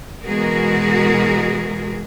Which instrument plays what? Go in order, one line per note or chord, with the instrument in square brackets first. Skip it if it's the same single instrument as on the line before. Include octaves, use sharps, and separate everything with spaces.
[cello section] B2 E3 G#3 F#4 G#4 A#4